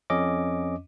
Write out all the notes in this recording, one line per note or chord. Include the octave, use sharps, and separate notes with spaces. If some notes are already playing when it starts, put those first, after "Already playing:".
F2 C#4 D#5 D6